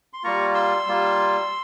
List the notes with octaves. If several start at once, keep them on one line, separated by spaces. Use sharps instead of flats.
C6
G3 A#3 F4 A#5 C#6
C6 E6
G3 A#3 F4